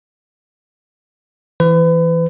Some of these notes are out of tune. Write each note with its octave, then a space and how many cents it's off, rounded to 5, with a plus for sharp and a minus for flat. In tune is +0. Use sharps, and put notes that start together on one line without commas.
E3 +0 B4 +35